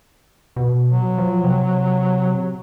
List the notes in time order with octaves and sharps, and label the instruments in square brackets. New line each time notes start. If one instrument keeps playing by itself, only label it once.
[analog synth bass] B2
[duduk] F#3
[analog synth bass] F3
C3